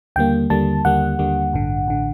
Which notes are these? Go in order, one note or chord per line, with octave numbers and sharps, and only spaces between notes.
D#2 D3 G3 A#3 G5
D#2 D3 G3 A#3 A5
D#2 D3 G3 A#3 F#5
D#2 D3 G3 A#3
A1 G2 D3
A1 D3